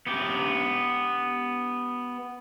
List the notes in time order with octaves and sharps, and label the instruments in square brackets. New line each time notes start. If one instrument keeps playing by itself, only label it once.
[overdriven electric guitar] B3 G4